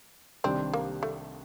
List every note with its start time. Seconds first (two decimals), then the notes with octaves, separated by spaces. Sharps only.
0.44 C2 C3 D#3 G3 C4 D4
0.74 A#3
1.03 A3